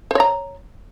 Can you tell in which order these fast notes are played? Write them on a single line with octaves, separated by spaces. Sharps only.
C5 C#5 A#5